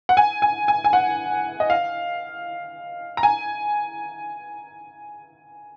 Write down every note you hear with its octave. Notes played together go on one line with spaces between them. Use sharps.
F#5
G#5
G#5
G#5
G#5
F#5
D#5
F5
A#5
G#5